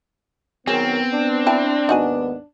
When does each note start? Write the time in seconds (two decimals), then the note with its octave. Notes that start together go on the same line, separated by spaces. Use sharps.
0.67 D#3 F#3 B3 C4 G#4 A#4
1.13 D4
1.46 E4 G5 A5
1.89 D#2 G#2 B3 D#4 F#4 G#5